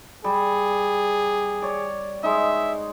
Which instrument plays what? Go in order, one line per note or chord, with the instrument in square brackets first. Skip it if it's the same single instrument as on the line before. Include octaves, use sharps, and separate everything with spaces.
[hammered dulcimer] G3 [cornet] G#4
[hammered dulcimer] C#5 D5
[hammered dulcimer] G#3 D#4 [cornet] E5